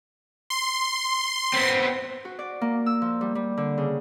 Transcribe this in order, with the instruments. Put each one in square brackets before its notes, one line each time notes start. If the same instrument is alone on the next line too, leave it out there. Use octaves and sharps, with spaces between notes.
[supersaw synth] C6
[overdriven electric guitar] B3 C4
[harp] F#4
D5
A#3
E6
F3
G3
G3
D3
C#3